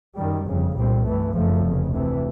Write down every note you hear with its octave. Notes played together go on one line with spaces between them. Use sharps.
F#2 D#3 G3
G1 F2 C#3
C2 A#2 G3 C4
G2 E3 A3
F#1 F#2 C#3 F3 A3
F1 E2 C#3
D2 C3 E3 A3